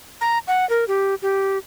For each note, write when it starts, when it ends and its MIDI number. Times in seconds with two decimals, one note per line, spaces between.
0.21 0.39 82
0.48 0.68 78
0.70 0.85 70
0.88 1.15 67
1.22 1.58 67